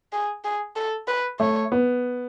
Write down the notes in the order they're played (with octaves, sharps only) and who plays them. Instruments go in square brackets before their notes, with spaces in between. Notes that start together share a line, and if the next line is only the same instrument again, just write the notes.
[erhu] G#4
G#4
A4
B4
[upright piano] A3 [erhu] C#5
[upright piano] B3